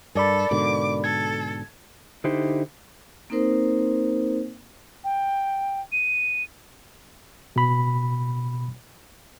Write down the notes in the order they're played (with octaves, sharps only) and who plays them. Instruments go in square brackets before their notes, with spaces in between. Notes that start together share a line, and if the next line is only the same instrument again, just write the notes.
[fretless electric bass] G2 [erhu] A4 [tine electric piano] A#4 D5 B5
[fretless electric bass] G#2 B2 D3 [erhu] D6
[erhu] A4 [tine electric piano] G#6
[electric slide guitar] D3 D#4 E4 G4 C5
[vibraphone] A#3 C4 D#4 A#4 C5
[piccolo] G5
D#7
[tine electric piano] B2 B5